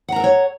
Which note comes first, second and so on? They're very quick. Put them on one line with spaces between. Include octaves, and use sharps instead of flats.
F#5 A#5 A#4 A4 C#5